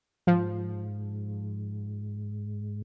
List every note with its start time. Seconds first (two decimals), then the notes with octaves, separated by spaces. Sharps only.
0.27 G#2 F3